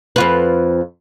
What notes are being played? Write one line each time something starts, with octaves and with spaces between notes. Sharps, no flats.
F2 F4 B4